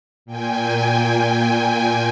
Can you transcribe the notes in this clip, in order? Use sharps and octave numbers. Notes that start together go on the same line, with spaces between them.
A#2 G5 G#5